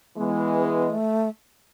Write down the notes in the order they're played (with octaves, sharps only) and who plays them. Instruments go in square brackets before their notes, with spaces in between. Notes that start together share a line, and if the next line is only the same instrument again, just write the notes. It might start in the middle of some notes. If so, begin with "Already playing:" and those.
[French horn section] E3 G#3 [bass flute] B3
[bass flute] A3